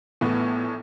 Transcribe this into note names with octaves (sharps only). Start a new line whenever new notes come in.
A#1 A2 E3 B3